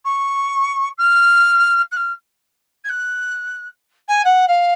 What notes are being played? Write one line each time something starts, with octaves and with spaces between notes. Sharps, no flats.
C#6
F6
F#6
F6
G#6
F#6
G#5
F#5
F5